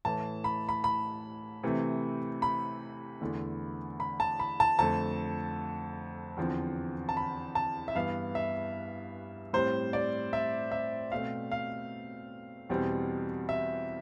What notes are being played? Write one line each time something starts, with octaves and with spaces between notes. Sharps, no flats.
A2 E3 A3 A5
B5
B5
B5
C3 E3 A3 C4
B5
E2 D3 A3
B5
A5
B5
A5
F2 D3 A3 A5
E2 D3 F3 C4
A5
B5
A5
E5
G2 E3 B3 F5
E5
A2 G3 C4 C5
D5
E5
E5
B2 A3 C4 F5
F5
E2 B2 G3 C4
E5